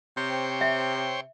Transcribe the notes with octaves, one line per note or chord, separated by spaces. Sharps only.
C3 C5 C#5 G5
E5